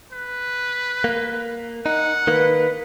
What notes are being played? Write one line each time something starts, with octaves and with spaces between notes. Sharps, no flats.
B4
A#3
D#4 F#5
D#3 A#3 B4